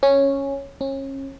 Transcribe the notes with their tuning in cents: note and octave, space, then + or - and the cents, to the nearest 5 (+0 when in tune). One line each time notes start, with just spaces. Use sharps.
C#4 -5
C#4 -30